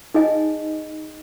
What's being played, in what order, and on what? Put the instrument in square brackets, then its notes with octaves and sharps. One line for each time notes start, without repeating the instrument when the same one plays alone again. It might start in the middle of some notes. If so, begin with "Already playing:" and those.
[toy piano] D#4 G#4 D#5 G#5